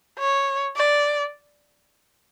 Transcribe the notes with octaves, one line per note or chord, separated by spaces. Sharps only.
C#5
D5